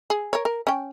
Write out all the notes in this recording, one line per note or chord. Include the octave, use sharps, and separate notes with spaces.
G#4
A#4 C#5
A#4
C#4 G5